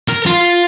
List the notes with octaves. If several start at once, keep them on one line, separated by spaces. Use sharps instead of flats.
A#4
F4